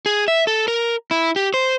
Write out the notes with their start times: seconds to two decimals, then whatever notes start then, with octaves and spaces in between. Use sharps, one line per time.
0.06 G#4
0.28 E5
0.47 A4
0.68 A#4
1.11 E4
1.36 G4
1.54 C5